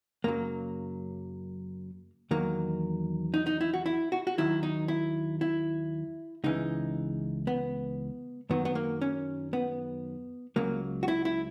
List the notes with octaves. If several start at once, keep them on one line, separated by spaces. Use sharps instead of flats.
F#2 C#3 F#3 A#3
E2 D#3 F#3 A#3
D#4
D#4
E4
F#4
E4
F#4
F#4
D#2 D#3 F#3 E4
D#4
E4
E4
C#2 C#3 E3 D#4
B3
F#2 D#3 F#3 B3
B3
A#3
C#4
B3
C#2 C#3 F#3 A#3
F#4
E4
E4